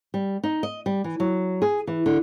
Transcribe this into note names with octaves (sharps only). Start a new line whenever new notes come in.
G3
D#4
D#5
G3
E3
F#3
G#4
E3
D3